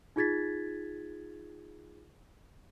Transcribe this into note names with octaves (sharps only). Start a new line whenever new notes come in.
D#4 F4 G#4 G#6 A6 B6